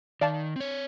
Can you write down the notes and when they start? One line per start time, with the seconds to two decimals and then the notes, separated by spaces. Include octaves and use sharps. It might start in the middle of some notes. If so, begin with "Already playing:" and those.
0.21 D#3 D5 F5 A5
0.56 C4 C#5